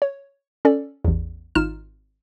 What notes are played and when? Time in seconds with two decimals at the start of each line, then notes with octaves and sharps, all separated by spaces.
0.02 C#5
0.65 C#4 A4 D5
1.05 A1 E2
1.55 G#1 D#4 F4 F6 E7